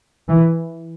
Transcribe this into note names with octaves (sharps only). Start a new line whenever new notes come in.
E3